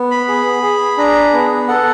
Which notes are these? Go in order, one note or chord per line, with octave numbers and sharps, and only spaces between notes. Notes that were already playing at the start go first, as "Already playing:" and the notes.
Already playing: B3
B5
G#4
G#4
D4 A#5
B3
A4 F#5